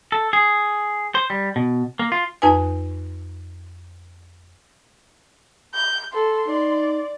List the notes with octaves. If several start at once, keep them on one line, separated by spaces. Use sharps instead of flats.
A4
G#4
C5
G3
B2
A#3
F4
F2 D#4 B4 G#5
G6
A4 C6
D#4 D5